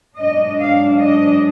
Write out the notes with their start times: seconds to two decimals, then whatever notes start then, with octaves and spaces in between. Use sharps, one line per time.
0.18 G#2 F#3 D4 D#5
0.60 F5
1.02 D#5